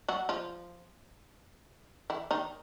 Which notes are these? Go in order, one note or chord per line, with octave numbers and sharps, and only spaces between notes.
F#3 F#4
F3 F4
E3 E4
D#3 D#4